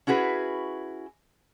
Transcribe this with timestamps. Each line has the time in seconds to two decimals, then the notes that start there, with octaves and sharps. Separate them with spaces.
0.07 C#4 E4 F#4 G#4 B4